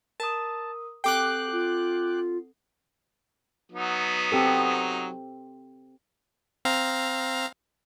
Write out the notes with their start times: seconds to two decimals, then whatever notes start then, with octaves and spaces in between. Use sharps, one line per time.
0.20 A#4 A5 D#6
1.04 C4 G4 A4 G5 D6 F#6 C7
1.52 F4
3.72 F#3 B3 D#4
4.32 C4 G4 A4
6.65 C4 F5 A#5